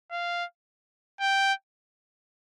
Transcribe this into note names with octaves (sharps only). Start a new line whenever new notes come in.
F5
G5